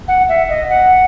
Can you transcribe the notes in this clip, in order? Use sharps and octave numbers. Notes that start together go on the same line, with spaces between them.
F#5
E5
D#5
F#5